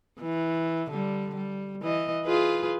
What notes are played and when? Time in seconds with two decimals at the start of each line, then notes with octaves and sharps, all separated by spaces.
0.20 E3
0.91 D3 G3
1.35 G3
1.83 E3 D#5
2.24 F4 G#4 B4